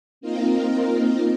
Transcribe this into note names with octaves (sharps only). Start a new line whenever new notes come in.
A#3 C4 D#4 F4 A#4